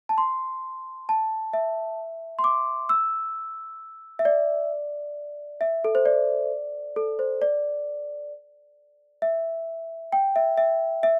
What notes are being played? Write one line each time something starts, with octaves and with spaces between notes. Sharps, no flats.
A5
C6
A5
E5
C6
D6
E6
E5
D5
E5
A4
C5
D5
A4
C5
D5
E5
G5
E5
E5
E5